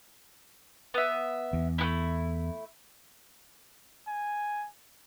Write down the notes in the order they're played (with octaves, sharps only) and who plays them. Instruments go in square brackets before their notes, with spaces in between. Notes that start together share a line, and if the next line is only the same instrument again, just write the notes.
[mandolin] B3 E5
[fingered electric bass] E2
[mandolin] A3 B3 E4
[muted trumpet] G#5